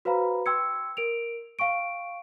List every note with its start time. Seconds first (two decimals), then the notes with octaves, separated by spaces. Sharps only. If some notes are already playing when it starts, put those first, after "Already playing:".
0.05 F#4 B4 C5 F5 A#5 B5
0.46 G5 C6 E6 G#6 C#7
0.97 A#4 D7 F7
1.59 F5 G5 C#6 D7